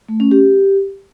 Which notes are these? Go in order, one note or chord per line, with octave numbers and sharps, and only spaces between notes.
A3
C#4
G4